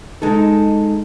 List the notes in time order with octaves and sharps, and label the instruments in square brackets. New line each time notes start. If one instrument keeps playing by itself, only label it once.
[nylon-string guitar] G#3 D#4 A4